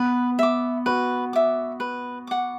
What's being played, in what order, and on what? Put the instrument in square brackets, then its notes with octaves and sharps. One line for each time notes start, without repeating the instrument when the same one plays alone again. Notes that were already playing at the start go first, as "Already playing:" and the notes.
Already playing: [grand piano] B3 [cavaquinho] B4
[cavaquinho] E5 D6
[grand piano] F#4 [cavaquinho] B4
[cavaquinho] E5 D6
B4
F#5 D6